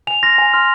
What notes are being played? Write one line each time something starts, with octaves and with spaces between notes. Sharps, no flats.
G#5 F7
C6 F6 A#6
G#5
C6 F6